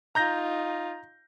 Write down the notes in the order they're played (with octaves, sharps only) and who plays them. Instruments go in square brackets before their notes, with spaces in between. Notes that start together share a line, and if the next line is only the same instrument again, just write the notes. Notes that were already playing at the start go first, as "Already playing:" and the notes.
[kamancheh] D#4 F4 [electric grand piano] A#5 G6 A#6